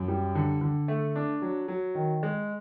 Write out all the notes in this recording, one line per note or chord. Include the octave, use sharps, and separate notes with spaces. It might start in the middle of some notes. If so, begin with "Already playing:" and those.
Already playing: F#2
G3
D3
D3
A3
D4
F#3
F#3
D#3
G#3